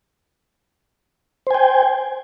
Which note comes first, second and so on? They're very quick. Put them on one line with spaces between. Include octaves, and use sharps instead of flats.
C5 G#5 G5